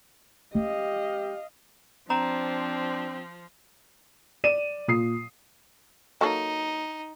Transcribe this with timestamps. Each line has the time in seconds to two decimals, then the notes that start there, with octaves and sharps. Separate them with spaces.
0.55 G#3 C#4 G4 D#5 F5
2.10 F3 C4 D4 A#5
4.44 D5 D#7 E7
4.88 A#2 D#6 C7
6.21 F#3 A#3 D#4 A4